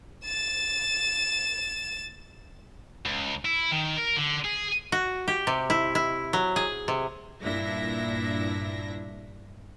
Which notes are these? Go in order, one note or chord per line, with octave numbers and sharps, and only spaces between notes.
A6 E7
C#2
E4
D#3
A#4
D3
G#4
F#4
G4
C3
E4
E4
F#3
G#4
C3
G2 A#2 D4 E4 E5 A#6